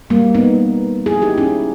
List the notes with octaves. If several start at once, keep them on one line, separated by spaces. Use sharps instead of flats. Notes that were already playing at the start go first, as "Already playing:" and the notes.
G3 A#3
B3 D#4
E4 G#4
D#4 G4
C#4 E4